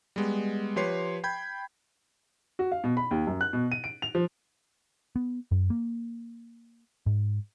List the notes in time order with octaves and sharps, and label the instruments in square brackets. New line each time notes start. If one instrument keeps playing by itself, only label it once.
[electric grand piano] G3 G#3 B3
F3 G4 B4 C#5 C6 C7
G5 B5 G6 G#6
[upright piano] F#4
F5
B2
B5
D#2
F#2
F#6
B2
D#7
D7
F7
F3
[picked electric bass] B3
F#2
A#3
G#2